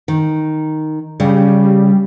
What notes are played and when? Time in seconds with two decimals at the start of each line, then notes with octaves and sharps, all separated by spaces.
0.08 D#3
1.20 C#3 G3